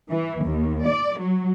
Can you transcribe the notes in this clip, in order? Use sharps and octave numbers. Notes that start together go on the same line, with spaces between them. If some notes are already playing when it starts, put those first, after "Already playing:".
E3
D#2
D5
F#3